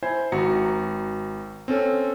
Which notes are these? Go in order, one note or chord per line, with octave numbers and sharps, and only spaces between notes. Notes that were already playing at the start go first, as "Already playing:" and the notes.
E4 C5 G#5 G#6
G#1 F#4 A#5 C#7
C4 C#4 A4